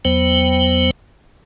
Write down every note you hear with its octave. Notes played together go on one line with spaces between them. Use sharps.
E2 F#3 B3 C5 G5